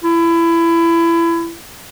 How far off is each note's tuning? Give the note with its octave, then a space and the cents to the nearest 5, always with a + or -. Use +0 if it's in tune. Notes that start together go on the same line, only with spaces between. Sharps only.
E4 +25